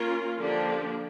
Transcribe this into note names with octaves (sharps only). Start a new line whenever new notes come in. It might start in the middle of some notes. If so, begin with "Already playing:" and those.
Already playing: A#3 C#4 F4 A#4
D3 F3 A#3 D4 G4